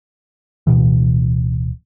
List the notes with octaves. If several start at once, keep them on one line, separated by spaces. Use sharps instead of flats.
D1 A#1 B2 E3